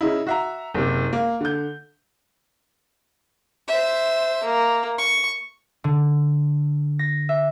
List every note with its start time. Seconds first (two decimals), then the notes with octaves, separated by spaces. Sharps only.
0.01 C#3 D#4 E4
0.27 F#4 E5 A#5
0.74 F#1 C3
1.13 A#3
1.41 D3 G6
3.68 C5 E5
4.43 A#3
4.98 C#6
5.84 D3
6.99 A#6
7.29 E5